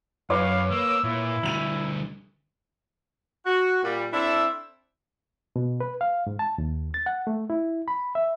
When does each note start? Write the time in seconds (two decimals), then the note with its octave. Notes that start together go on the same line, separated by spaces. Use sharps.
0.30 F#2 B4 C#5 F5 D6
0.70 A#3 E6
1.04 A#2 E4
1.43 D2 G3 D#7 F7 F#7
3.46 F#4
3.83 A#2 G3
4.13 C4 D4 E4 A4 E5
5.56 B2
5.80 B4
6.01 F5
6.27 G#2
6.39 A5
6.58 D#2
6.94 A6
7.06 F#5
7.27 A3
7.50 E4
7.88 B5
8.15 E5